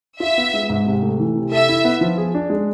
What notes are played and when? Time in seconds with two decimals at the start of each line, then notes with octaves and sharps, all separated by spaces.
0.20 F4 E5
0.37 B3
0.54 G#3
0.70 G#2
0.86 C3
1.02 A3
1.19 E3
1.35 C3
1.52 A4 E5
1.69 E4
1.85 B3
2.01 F3
2.17 G#4
2.34 D4
2.50 G#3